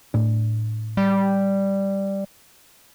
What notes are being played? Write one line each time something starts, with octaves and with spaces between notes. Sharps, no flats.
A2 D4
G3